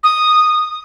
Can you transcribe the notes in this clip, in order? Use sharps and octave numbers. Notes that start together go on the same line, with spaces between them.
D#6